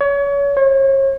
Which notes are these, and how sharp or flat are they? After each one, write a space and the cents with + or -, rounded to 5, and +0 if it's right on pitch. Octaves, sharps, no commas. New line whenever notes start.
C#5 +30
C#5 -40